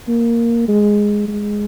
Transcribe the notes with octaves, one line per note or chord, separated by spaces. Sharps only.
A#3
G#3
G#3